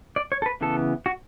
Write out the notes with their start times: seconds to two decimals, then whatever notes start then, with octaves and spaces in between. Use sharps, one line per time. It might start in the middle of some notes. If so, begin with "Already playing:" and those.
0.16 D5
0.32 C#5
0.42 A4
0.46 B4
0.61 C#3 E3 B3 A4
1.06 F#4